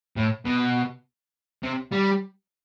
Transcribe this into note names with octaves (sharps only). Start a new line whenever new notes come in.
A2
B2
C3
G3